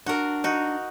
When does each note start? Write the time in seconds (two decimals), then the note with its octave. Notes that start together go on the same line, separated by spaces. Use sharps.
0.06 D4 F#4 A#4
0.44 D#4 F#4